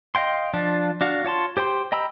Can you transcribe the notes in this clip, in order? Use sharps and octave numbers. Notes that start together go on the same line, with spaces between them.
D#5 F5 G5 C6
F3 D4 F4
D4 F#4 F5
F4 C#5 A5 C6
G4 C5 G5 C6
D#5 G5 A#5 B5 E6